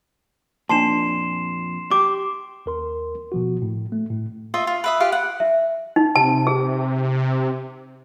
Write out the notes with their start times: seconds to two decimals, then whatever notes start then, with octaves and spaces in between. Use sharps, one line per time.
0.69 F2 A#2 D4 A5 C6 C7 E7
1.91 G4 D6
2.66 D#2 A#4 C6
3.32 B2 F3 F#4
3.62 A2
3.92 A3
4.10 A2
4.54 F4 D#5 E5
4.67 F4
4.84 B4 E5 D#6
5.00 F4 G4 F5
5.12 F#5
5.40 E5
5.96 D#4
6.16 C3 A5
6.47 G#4